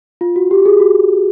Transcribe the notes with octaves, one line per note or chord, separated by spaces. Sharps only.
F4
F#4
G4
G#4
F#4